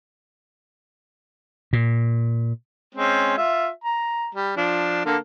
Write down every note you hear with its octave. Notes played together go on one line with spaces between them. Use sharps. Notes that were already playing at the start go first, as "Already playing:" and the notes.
A#2
G#3 C4 C#4
F4 E5
A#5
G3
F3 D4
D3 A#3 A4